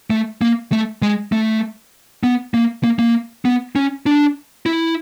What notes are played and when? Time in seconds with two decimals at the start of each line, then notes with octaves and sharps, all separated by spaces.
0.10 A3
0.41 A#3
0.72 A3
1.02 G#3
1.32 A3
2.23 B3
2.54 A#3
2.84 A#3
2.99 A#3
3.45 B3
3.76 C#4
4.06 D4
4.66 E4